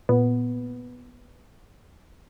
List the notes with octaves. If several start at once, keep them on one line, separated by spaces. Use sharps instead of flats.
A#2 B3